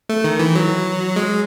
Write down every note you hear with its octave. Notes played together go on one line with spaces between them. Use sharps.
A3
D#3
E3
F#3
G#3